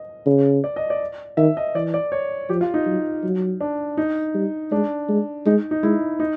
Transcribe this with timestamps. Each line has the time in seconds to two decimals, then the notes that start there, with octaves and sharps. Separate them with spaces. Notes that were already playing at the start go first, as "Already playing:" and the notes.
Already playing: D#5
0.26 C#3
0.64 D5
0.76 D#5
0.90 D5
1.37 D#3 E5
1.57 D#5
1.75 E3 D5
1.94 D5
2.12 C#5
2.49 F3 G4
2.61 F4
2.74 D#4
2.86 F#3
3.23 F#3
3.61 D4
3.97 D#4
4.35 G3
4.71 G#3 D4
5.09 G#3
5.46 G#3 D#4
5.71 D#4
5.83 G#3 E4
6.20 D#4